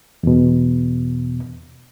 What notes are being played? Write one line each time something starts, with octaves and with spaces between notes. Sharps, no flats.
E2 B2